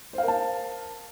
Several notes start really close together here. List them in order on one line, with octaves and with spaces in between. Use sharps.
C5 F5 A#4 A5